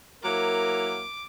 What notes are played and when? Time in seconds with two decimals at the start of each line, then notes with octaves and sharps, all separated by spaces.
0.23 F#3 A#3 E4 A#4 D6